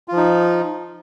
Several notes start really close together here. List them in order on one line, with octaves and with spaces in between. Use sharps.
F4 F3 D#4